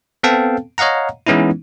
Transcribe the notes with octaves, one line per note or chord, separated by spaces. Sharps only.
B3 C4 A4 F5 G5 A5
C#5 D#5 F5 F#5 A#5
E3 G#3 B3 C#4 D#4 E4